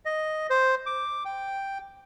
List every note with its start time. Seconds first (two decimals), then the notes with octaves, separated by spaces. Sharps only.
0.05 D#5
0.50 C5
0.86 D6
1.25 G5